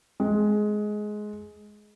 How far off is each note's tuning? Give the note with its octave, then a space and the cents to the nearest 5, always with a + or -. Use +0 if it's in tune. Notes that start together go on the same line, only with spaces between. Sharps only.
G#3 +15